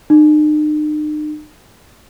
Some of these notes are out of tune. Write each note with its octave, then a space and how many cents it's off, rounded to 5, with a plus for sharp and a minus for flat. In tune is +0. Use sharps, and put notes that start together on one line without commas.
D#4 -45